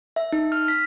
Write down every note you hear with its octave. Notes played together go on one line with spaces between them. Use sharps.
E5
D#4
F6
B6